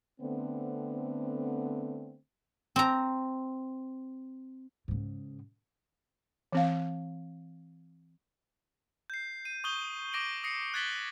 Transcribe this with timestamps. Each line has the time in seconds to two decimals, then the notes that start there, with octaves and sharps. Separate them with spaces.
0.20 D3 A3 B3 C4
2.76 C4 A#5
4.88 G#2 C#3
6.52 E3 C4 F5
9.10 G6 C7
9.45 D#7
9.64 C#6 D#6 G6 G7
10.13 D6 A#6 D7 F#7
10.44 D#6 A#6 C7 C#7
10.74 F#6 G#6 A6 B6 F#7 G7